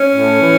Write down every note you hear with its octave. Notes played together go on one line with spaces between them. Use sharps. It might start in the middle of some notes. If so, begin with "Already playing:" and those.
Already playing: C#4
A2
E3